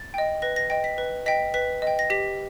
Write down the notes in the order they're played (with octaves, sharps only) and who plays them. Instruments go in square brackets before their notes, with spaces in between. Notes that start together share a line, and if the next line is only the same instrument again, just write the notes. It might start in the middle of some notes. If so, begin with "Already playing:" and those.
Already playing: [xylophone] A6
D#5 G5
B4 A#6
A#6
D#5 G5 A#6
B6
B4
D#5 G5 B6
B4 B6
D#5 G5
A#6
G4 B6